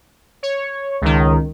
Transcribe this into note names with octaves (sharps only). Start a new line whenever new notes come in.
C#5
C#2 D#3